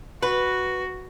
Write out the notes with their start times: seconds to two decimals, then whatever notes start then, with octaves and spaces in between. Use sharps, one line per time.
0.23 F#4 B4